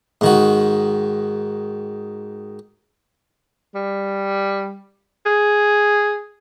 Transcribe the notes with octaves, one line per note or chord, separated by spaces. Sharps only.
G#2 D#3 F#4
G3
G#4